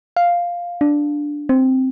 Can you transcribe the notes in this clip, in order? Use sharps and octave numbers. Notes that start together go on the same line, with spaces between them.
F5
D4
C4